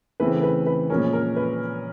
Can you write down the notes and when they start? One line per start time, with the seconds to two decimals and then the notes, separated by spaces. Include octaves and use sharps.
0.20 C#3 E3 A3 C4 B4
0.43 B4
0.66 B4
0.90 A#2 F3 G#3 C#4 A#4
1.13 A#4
1.36 B4